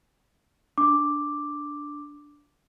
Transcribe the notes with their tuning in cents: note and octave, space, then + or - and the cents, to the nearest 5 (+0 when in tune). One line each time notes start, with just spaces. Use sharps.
D4 +0 D6 +0